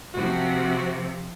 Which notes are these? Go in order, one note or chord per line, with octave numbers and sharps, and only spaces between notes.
C3 F3 F#4